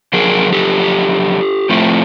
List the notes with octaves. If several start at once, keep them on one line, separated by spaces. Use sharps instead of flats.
F2 D3 F#3 G#4 A#4
G4 A4
A2 F3 A3 C4